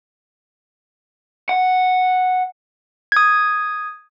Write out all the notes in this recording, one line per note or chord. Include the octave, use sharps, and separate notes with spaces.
F#5
D#6 G#6